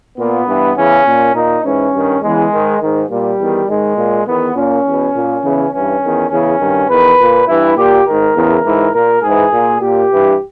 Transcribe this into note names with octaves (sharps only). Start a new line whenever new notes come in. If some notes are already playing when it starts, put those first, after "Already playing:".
A#2 B3
G2 E3
E2 C#3 E3 C#4
A#2
A#2 D#4
G#2 E3 C#4
G2 D#3
E2 C#3 E3 G#3
G#2 D#3
G#2 D#3
A#2 G3
E2 D#3
G#2 D#3 G#3
A#2
E2 D#3 B3
A#2 C#4
E2 B2
A#2
E2 C#3 E3
G2 E3 C#4
E2 D#3
E2 C#3 E3 C#4
G2 D#3
E2 D#3 B4
A#2
G2 E3 E4
A#2 G4
G#2 D#3 A#4
E2 C#3 E3
G#2 E3
A#2 A#4
G#2 E3 G#4
A#2
A#2 G4
G2 E3